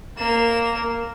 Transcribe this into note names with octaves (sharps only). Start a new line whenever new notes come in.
A#3 E7